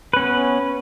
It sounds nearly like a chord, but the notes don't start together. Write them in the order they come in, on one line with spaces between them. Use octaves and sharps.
B4 C#4 B3